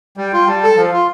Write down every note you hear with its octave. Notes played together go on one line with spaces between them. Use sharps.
G3 G5
F4
G3 A5
A4
F3 F5
F4